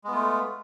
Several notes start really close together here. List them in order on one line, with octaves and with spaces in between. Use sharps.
G#3 B3 F4 A3